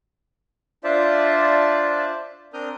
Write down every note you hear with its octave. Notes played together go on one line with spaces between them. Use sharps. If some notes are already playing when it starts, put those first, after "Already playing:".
D4 F4 C5 D5 E5 A5
C4 D4 A#4 D#6 F6 G6